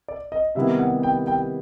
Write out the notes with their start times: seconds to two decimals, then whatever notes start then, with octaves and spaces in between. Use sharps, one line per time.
0.08 D5
0.32 D#5
0.55 C3 D#3 G3 B3 E4 E5
0.79 F#5
1.03 G5
1.27 G5